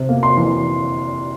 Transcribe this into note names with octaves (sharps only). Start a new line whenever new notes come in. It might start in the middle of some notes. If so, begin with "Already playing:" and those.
Already playing: C3
A#3
C6
E3